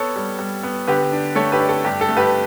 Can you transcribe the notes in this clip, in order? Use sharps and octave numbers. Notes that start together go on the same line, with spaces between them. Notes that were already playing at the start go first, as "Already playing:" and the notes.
Already playing: B3 A4 C#5
G3
G3
B3
D3 G4 B4
D4
A3 A4 C#5
G4 B4
D4
A4
G2 G4
A4
A3
G4 B4